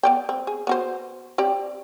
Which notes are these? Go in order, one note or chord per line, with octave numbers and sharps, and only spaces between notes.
B3 D5 G5
C4
G#4
B3 F#4 C5
C4 G4 D5